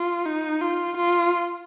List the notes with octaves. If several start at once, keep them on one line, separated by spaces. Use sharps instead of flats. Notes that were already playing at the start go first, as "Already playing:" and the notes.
Already playing: F4
D#4
F4
F4